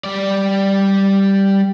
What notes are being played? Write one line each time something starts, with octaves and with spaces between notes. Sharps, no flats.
G3 D5